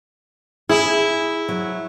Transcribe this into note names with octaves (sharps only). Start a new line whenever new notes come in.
E4 G#4
F#3